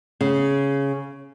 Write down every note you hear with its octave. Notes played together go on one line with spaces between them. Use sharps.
C#3